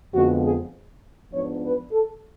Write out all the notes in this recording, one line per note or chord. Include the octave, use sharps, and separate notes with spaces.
F2 D3 G#3 B3 F#4
G#4
G#2 F3 B3 D4 C#5
B4
A4